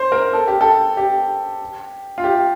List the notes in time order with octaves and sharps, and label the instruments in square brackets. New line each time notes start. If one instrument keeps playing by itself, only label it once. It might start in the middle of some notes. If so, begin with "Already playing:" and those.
Already playing: [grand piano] C5
A#4
A4
G4
A4
G4
F4
G4